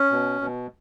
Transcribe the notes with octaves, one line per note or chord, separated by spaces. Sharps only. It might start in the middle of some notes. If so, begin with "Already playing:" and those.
Already playing: C#4
B2
B2